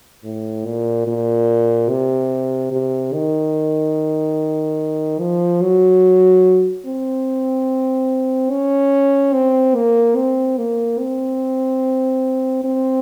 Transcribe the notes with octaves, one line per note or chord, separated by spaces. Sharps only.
A2
A#2
A#2
C3
C3
D#3
F3
F#3
C4
C#4
C4
A#3
C4
A#3
C4
C4